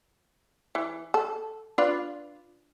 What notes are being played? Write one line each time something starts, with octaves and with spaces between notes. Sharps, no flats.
E3
A4
D4 F4 B4